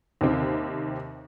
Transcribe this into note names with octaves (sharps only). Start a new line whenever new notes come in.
D#2 C3 C4